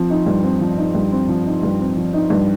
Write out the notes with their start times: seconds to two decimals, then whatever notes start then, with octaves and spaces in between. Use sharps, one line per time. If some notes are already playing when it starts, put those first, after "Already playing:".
Already playing: F3 C4
0.10 D#4
0.26 G2
0.43 C4
0.61 F3
0.77 D#4
0.95 G2
1.12 C4
1.28 F3
1.46 D#4
1.63 G2
1.80 C4
1.97 F3
2.13 D#4
2.30 G2